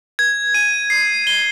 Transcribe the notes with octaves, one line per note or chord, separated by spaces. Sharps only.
G#6
D#7
C7
G7